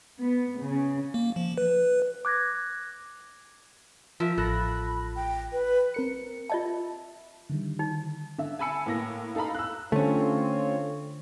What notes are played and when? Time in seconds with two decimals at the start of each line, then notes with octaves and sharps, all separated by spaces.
0.20 B3
0.60 C#3
1.14 A#3
1.36 F3
1.58 B4
2.25 D6 F#6 G#6 A#6
4.20 F3 A#4 E5
4.38 A1 A4 B5 F#6 A#6
5.15 G5
5.53 B4
5.94 C4 A#4 C#7
6.50 F4 D#5 E5 A5
7.50 D3 D#3 G3
7.79 D#4
8.38 D3 E5
8.59 G#5 A5 B5 E6 C#7
8.86 A2 A#3 A#6
9.35 D#4 A4 F5 A#5 B5
9.54 E6 F#6
9.92 D3 A3 C4 C#4 F4 C#5